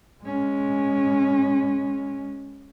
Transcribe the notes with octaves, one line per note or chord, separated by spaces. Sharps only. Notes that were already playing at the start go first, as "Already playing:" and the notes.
G#3 C#4